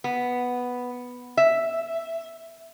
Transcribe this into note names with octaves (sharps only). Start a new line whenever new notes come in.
B3
E5